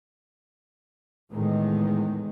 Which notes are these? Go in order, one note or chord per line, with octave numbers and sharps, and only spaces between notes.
E2 A2 D#3 G#3